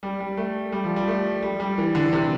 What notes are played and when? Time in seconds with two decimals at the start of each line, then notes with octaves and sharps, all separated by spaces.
0.03 G3
0.20 G3
0.37 A3
0.72 G3
0.84 F3
0.96 G3
1.08 A3
1.42 G3
1.60 G3
1.78 E3
1.95 D3
2.13 C3